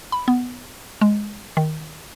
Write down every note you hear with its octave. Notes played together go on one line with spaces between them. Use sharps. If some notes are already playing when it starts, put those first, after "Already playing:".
B5
B3
G#3
D#3